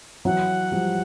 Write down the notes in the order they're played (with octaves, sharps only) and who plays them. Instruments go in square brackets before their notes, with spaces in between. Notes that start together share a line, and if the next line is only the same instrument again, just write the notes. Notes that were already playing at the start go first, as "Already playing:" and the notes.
[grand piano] E3 F#3 [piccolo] F#5
[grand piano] F3 G3